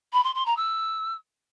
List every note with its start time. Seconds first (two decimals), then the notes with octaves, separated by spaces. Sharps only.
0.13 B5
0.24 C6
0.35 C6
0.46 A#5
0.57 E6